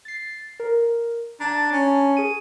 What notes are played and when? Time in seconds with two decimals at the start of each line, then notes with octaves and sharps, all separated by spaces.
0.05 A6 C7
0.60 A#4
1.40 D4 A5 A#5
1.71 C#4
2.17 G#4 D#7